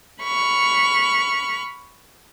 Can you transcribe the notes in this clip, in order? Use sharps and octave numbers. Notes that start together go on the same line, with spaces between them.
B5 C#6 F6